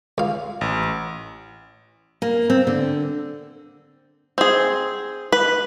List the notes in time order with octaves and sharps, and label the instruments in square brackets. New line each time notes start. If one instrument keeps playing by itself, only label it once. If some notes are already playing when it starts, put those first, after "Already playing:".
[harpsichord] C#2 F5
[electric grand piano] A1
[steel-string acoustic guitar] A#3
C4
D3
[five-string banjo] C4 G#4
B4